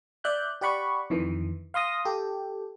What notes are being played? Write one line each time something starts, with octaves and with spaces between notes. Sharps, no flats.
D5 E5 F#6 G6
G4 D5 F#5 B5 C#6
F2 D#3 E3
F5 C6 D#6 A#6
G4 A4